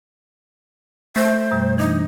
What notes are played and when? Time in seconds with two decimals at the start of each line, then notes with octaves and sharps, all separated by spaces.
1.16 A3 C5
1.51 F#2 B2 G3
1.78 E3 D4 D#4